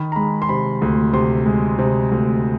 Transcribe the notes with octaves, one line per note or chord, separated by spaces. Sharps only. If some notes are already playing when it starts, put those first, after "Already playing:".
Already playing: D#3 B5
A#5
G#3 B5
C6
C3 B5
D2
C3 C6
G#3
C3
D2